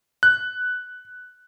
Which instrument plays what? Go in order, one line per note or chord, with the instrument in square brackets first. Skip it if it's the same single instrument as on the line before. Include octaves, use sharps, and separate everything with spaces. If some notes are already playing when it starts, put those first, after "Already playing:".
[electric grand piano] F#6